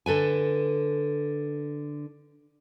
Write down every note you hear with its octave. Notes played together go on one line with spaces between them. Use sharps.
D3 A4 B4 G#5